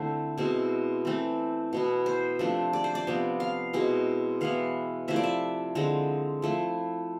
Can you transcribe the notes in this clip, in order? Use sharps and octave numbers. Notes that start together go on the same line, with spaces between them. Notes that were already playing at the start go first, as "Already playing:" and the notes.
Already playing: D3 A3 C4 E4 C5
B2 G#3 C4 E4
E3 A3 C4
B2 B3 E4
C5
C3 F3 A3 D4
D5
C5
D5
C3 F3 B3
F5
B2 G#3 C4 E4
E3 B3 E4 F5
C3 F3 A3 E4 E5
D5
E5
D3 G#3 C4
F3 A3 E4